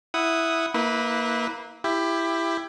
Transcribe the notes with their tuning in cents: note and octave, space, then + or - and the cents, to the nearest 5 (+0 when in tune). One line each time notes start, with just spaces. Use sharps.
E4 +0 F#5 +0 D#6 +0
A#3 +0 E4 -30 B4 +0
E4 +15 G4 +15